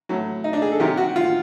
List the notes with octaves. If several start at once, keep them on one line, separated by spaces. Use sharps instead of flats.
A2 F#3
D#4
D4
G#4
A4
C3 D#3 F#3 G4
F#4
F4